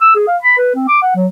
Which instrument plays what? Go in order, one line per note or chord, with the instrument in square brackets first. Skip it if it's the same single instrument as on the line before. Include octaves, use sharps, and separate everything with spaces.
[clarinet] E6
G#4
F5
B5
B4
C4
D6
F#5
F#3